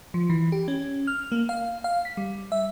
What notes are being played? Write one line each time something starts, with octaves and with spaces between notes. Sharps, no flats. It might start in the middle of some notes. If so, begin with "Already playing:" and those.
F3
E3
G4
C#4
F6
A#3
F5
F5
B6
G3
E5